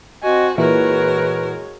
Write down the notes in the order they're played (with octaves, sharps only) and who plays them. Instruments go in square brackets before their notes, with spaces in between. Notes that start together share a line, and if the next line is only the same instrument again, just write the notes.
[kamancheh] C4 G#5 [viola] F#4 [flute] D#5
[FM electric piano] A#2 E3 [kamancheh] G#3 C#5 [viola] F#4 A#4 [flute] B4